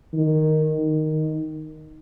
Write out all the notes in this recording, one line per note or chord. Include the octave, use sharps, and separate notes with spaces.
D#3
D#3